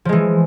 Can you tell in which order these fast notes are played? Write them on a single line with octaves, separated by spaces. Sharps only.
F3 G#3 E3